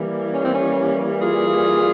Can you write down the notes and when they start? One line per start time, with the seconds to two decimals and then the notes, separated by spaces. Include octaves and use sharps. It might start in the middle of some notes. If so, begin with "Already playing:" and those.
Already playing: E3 G3 A#3
0.33 C#4
0.42 C4
0.52 C#4
1.20 F4 G#4